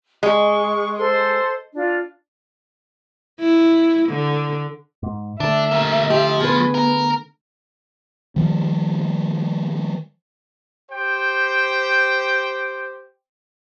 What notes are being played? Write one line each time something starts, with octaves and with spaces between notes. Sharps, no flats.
G#3 C#6
A4 C5 C6
D4 F4
E4
D3
G#2
D3 A3 D4 E5
G3 A#3
F3 G4
B3 G#4 B4
A#4
D#3 F3 G3
G4 C5 G5